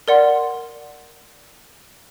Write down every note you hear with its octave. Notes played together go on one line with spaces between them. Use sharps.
A#4 D5 F#5 C6